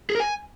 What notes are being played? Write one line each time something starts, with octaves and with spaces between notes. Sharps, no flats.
G#4
A#4
G#5